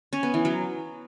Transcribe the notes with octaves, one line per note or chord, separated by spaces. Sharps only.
C#4
B3
E3
F#3